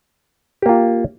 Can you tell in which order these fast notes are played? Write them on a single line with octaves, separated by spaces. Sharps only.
G4 A#3 F4